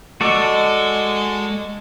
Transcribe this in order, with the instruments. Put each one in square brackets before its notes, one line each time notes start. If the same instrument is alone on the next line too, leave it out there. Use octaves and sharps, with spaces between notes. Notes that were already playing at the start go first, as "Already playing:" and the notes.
[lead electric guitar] G#3 D#5 [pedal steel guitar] F#4 A4 D5